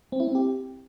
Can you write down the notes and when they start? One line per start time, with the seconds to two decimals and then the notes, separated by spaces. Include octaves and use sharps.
0.12 C4
0.20 E4
0.27 C4
0.35 G4